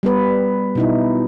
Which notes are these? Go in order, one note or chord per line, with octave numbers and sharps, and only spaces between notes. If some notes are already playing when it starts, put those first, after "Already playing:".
G3 B3 B4
B2 D#4 E4